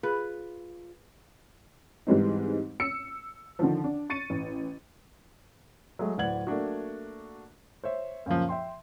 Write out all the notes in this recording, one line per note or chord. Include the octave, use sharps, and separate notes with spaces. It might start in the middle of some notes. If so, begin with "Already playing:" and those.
F4 G#4 B4
G#2 E3 G3 G#3 C4 D#4
E6 C#7
D3 D#3 F3
D4
C#6 A6 C#7 D#7
A1
F#3 G#3 A3
D1 B4 D5 F#5 G#6 F#7
A3 A#3 D4 F#4
C5 C#5 E5
F#2 A#2 C#3 F3
E5 G5 C6